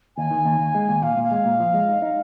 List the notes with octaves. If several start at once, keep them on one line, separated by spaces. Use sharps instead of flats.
D#2 G#5
D#3
D#2
D#2
G#3
D#2
A#2 F5
A#2
F5
G#3
A#2
F3
G#3
D#4
D#4